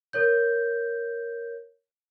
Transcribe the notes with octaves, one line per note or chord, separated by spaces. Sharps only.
A#4 C#5 G6